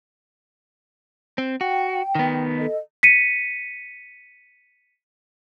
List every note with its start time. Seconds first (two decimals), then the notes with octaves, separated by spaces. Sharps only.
1.38 C4
1.61 F#4 G5
2.15 D#3 B3
2.58 A4 D#5
3.03 B6 C#7 D#7